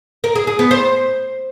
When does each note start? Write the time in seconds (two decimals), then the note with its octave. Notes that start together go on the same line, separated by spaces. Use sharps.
0.24 A#4
0.35 G#4
0.47 G#4
0.59 B3
0.71 C5